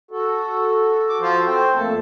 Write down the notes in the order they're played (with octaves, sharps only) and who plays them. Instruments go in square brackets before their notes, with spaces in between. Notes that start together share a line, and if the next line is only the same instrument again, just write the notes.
[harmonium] F#4 A4
[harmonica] D6
F3 F4 C5
C4 C5 G5
[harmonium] F2 A3 A#3 [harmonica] A4